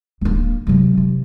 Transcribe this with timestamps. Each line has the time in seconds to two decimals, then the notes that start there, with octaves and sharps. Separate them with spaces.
0.21 D1 A#3
0.67 C3 F#3
0.97 C3